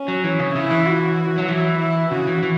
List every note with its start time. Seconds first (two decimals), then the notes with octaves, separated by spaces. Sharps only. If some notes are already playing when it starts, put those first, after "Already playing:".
Already playing: C#4
0.08 F#3
0.24 E3
0.39 C#3
0.55 C#3 E4
0.70 E3
0.86 F#4
1.38 F#3
1.48 E3 E4
1.80 E4
2.11 C#3 F#4
2.27 E3
2.43 E3